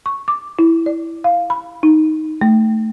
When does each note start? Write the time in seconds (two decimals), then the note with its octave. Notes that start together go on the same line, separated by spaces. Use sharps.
0.06 C#6
0.28 D6
0.59 E4
0.86 D5
1.24 F5
1.50 B5
1.83 D#4
2.41 A3